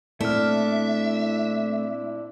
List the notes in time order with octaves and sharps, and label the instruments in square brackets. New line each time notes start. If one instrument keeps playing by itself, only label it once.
[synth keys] A#2 C4 E4 [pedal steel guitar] A3 F6 [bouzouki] D4 [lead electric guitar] E5